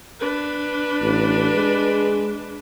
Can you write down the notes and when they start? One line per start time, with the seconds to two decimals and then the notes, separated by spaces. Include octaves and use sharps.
0.20 D4 B4
1.01 A1
1.55 G#3